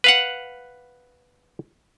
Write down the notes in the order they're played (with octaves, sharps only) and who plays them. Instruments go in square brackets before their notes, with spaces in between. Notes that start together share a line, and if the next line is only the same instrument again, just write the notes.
[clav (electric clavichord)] B4 F5 F#5